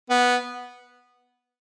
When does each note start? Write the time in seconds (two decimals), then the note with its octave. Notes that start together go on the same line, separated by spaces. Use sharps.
0.10 B3